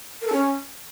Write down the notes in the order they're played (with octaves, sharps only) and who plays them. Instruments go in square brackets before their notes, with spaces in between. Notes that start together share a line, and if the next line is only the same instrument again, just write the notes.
[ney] A#4
A4
C#4